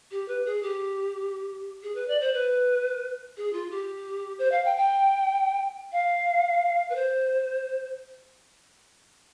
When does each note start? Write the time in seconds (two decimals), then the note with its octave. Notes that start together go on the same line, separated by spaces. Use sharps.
0.11 G4
0.28 B4
0.45 G#4
0.63 G4
1.82 G#4
1.95 B4
2.08 D5
2.21 C5
2.34 B4
3.37 G#4
3.53 F4
3.71 G4
4.39 C5
4.51 F5
4.65 G5
4.77 G5
5.92 F5
6.89 B4
6.95 C5